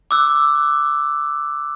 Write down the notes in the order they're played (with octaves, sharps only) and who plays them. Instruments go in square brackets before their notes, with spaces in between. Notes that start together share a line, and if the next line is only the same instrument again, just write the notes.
[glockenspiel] D6 E6 F#6